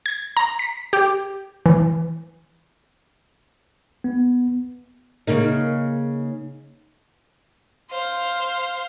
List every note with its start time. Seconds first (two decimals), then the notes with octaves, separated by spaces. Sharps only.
0.06 G#6
0.37 A#5
0.59 B6
0.93 G4
1.66 E3
4.04 B3
5.27 C#3 A#3 D#4
7.92 C5 F5